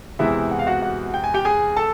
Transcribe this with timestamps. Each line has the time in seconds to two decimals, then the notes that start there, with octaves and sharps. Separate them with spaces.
0.19 E2 C3 E3 G#3 E4 E5
0.51 F#5
0.59 F5
0.67 F#4 F#5
0.82 F#4 F#5
1.14 G5
1.24 G#5
1.34 G4 G5
1.45 G#4 G#5
1.76 A4 A5